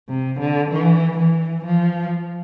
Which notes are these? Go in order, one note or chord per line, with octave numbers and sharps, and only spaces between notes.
C3
D3
E3
E3
F3